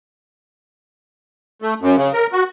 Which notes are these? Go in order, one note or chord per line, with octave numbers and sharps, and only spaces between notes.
A3
F#2
C#3
A#4
F#4